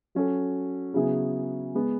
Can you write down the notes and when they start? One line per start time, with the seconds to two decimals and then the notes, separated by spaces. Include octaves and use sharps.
0.15 F#3 C#4 F#4 A4
0.94 C#3 F#3 B3 E4 G#4
1.75 G#3 B3